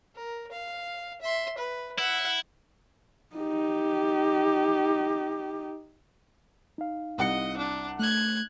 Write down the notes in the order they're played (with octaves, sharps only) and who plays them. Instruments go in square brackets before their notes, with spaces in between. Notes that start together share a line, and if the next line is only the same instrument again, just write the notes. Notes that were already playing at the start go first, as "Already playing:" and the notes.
[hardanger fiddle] A#4
F5
E5 C6
B4
[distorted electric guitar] E4 [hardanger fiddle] F#5
[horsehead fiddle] D#4 G4
[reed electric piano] D#4 F5
[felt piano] C2 F#5 C#7 [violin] D#5
[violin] D4
[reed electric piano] A3 [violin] F#6 G#6